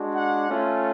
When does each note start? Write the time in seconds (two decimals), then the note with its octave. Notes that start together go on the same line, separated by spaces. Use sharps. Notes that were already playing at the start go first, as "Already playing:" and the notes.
Already playing: G#3 D4 F#4
0.15 F#5
0.48 A3 C#4 F4